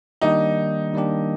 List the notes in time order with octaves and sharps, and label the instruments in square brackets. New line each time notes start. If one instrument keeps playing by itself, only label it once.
[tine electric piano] D#3 G3 A#3 D4 G4 [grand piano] D#4
[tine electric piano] D#3 G3 A#3 D4 G4